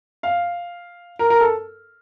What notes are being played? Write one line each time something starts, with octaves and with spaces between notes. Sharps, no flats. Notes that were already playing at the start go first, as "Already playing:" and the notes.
F5
A#4
A#4
A4